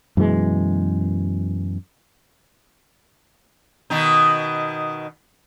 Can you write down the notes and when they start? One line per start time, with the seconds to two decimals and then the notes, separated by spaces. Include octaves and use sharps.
0.17 F#2 B2 E3 G#3
3.90 B2 D#3 D#4